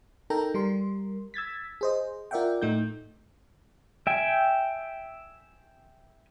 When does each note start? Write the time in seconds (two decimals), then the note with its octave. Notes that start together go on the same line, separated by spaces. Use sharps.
0.30 D#4 A4 A#4 G5 A#5
0.54 G3 A#4 C6
1.34 E6 G#6 A6 B6
1.81 G#4 C5 D#5
2.31 F4 A#4 D5 E5 F#5 G5
2.62 A2 A3 D#4 G6
4.07 E5 G5 G#5